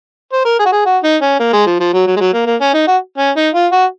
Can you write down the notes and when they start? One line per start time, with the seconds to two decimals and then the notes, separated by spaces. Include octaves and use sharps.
0.33 C5
0.45 A#4
0.59 G#4
0.66 F#4
0.72 G#4
0.86 F#4
1.03 D#4
1.22 C#4
1.39 A#3
1.53 G#3
1.66 F3
1.80 F3
1.94 F#3
2.07 F#3
2.16 G#3
2.20 F#3
2.33 A#3
2.46 A#3
2.61 C#4
2.74 D#4
2.87 F#4
3.18 C#4
3.36 D#4
3.54 F4
3.72 F#4